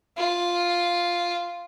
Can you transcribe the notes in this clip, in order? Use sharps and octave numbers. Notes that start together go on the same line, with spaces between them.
F4